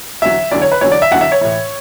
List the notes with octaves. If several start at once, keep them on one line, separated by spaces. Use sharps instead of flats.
E2 D3 F#3 E5
E2 D3 F#3 D5
C#5
B4
E2 D3 F#3 C#5
D5
E5
E2 D3 F#3 F#5
E5
C#5
A2 E3